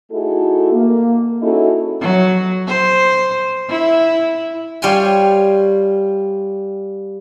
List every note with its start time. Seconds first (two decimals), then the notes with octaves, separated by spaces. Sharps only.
0.11 A3 D#4 E4 F#4 G#4 A4
0.73 A#3
1.42 C#4 D#4 E4 F#4 G#4 A4
2.01 F#3
2.68 C5
3.69 E4
4.82 G3 F4 C#5 G5 G#5 C6